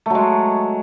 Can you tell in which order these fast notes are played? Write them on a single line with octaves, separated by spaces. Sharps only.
A3 F#3 G#3